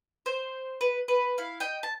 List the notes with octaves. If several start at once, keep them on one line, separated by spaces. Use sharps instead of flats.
C5
B4
B4
E4 F5
D#5 G5
A5